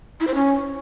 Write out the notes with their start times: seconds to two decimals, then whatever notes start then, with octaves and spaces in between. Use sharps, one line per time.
0.20 E4
0.27 C5
0.34 C#4